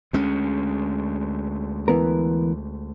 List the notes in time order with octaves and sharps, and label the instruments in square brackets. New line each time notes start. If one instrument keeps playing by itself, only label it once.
[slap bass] D2 G#3 C#4
[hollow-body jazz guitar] E3 B3 A#4